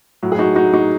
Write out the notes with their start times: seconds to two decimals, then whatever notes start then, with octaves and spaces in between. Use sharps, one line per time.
0.23 A2 F#3
0.32 G#4
0.39 D#4 F#4
0.56 D#4 F#4
0.74 D#4 F#4